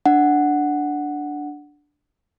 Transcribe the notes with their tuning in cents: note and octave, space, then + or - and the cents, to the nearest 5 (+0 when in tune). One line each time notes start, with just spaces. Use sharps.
D4 +0 F#5 +0